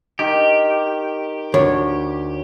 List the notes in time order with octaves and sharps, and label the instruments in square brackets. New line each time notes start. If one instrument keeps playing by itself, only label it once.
[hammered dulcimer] D#3 [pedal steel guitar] G4
[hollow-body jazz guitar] D2 [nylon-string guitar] C#5